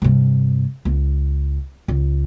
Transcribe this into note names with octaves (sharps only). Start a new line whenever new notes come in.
G2 C3
C#2
C#2